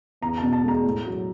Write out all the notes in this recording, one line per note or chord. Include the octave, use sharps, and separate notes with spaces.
E2 A#5
A5
B2
A5
G#3 A#5
A2
F#3